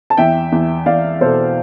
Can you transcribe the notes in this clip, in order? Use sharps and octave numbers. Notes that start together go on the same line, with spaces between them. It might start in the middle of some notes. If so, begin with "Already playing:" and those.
A5
E2 E5 G5
E2
E2 D5 F5
B2 A4 C5